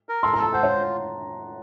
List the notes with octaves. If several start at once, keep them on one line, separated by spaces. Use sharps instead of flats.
A#4
A4 C6
A#5
A4 A5
C5 F#5
C#5
F4